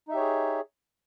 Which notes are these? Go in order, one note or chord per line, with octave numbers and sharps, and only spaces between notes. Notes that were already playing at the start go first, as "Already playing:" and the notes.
D#4 G4 G#4 C#5 E5